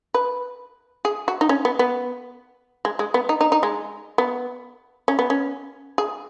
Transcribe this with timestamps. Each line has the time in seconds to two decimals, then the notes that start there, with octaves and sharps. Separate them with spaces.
0.14 B4
1.05 G#4
1.28 F#4
1.41 D#4
1.49 C#4
1.65 B3
1.79 B3
2.85 G#3
2.99 G#3
3.14 B3
3.29 D#4
3.41 D#4
3.52 D#4
3.63 G#3
4.18 B3
5.08 C#4
5.19 B3
5.30 C#4
5.98 G#4